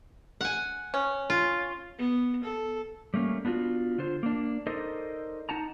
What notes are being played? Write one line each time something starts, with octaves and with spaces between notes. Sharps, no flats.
F#5 G#5
C#4
F4
B3
A4
G3 A3 A#3 C#4
B3 D4 F4 F#4
D3 F4 C5
A#3 D4
D#4 A4 A#4 C5 D5 D#5
D#4 F#5 A5 A#5